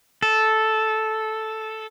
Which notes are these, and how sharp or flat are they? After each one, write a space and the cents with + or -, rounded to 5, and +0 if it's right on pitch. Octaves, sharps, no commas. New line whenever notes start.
A4 -5